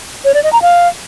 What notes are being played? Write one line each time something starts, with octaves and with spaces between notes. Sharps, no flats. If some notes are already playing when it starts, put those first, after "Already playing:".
C#5
D5
D#5
A#5
F5